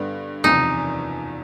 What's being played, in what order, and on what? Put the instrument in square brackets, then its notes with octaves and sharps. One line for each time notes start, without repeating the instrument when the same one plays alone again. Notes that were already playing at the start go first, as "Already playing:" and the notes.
Already playing: [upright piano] G2 D3 G3 B3
[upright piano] F#1 E2 C3 F3 [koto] D#4